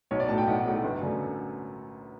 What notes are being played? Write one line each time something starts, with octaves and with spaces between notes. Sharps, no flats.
B1 C#5
D5
A2 F#3 A3 A5
G5
B1 F#5
A2 F#3 A3
G1
F#2 D3 A3